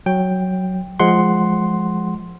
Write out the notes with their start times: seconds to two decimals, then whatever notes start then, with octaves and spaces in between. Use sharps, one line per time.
0.06 F#3 G5
1.00 F3 G#3 F#5 C6